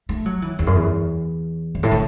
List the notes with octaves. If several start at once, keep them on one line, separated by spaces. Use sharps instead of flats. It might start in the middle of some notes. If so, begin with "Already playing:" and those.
A3
F#3
E3
E2
F#2
E2
F#2
A2
D3